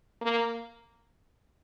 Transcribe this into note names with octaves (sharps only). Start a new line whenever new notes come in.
A#3